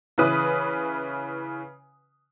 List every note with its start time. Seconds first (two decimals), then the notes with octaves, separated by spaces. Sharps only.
0.18 C#3 E3 B4 D#6